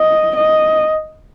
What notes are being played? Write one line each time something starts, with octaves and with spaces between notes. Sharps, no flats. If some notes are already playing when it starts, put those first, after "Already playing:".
Already playing: D#5
D#5